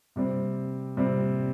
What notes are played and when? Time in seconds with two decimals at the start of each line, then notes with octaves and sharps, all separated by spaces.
0.16 C3 G3 C4
0.97 C3 G3 C4